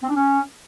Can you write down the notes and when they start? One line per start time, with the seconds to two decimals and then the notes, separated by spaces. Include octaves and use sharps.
0.03 C4
0.09 D4
0.15 C#4